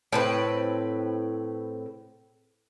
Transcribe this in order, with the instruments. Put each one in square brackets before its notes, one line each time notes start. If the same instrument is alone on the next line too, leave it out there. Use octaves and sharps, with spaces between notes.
[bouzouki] A2 C4 B4